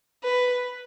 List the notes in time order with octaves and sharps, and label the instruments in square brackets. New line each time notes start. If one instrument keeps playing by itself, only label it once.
[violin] B4